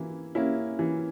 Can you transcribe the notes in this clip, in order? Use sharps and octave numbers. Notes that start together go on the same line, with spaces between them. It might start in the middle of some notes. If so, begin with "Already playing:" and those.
Already playing: E3 A#3 E4
A#3 C#4 E4
E3